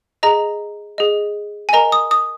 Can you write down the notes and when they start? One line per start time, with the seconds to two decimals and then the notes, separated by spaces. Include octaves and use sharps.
0.23 G#4 D#5 A#5
0.98 G#4 D#5
1.69 G#5
1.73 A#4 D#5 A#5
1.92 D#6
2.11 D#6